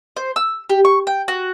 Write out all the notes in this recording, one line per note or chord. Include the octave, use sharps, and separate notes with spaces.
C5
E6
G4
C#6
G5
F#4